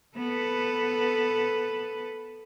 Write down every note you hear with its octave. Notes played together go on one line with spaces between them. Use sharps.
B3 A4 B4